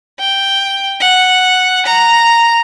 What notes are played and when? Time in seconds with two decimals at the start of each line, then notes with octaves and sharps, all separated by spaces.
0.19 G5
1.00 F#5
1.86 A#5